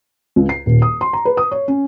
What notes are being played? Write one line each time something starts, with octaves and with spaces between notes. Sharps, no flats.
C#2
C7
D#1
D#6
C6
A#5
B4
D#6
C#5
C#4